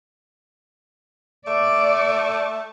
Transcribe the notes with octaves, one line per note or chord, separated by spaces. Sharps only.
A3 D5